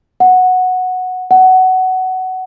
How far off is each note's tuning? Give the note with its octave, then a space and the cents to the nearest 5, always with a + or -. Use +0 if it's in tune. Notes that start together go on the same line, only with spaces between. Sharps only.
F#5 -5
F#5 +15